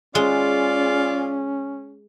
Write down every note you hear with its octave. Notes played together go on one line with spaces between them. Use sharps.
G#3 C#4 F4 G#4 D5